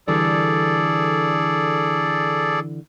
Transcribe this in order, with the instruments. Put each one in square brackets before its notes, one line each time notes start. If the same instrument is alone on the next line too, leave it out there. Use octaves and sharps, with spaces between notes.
[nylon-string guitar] D3 E3 G3 [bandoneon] G#4 A4 D5